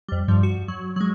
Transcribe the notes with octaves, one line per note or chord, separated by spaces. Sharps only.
F2 G3
G2 F3 G3
F#4
F#3
F#3 G#3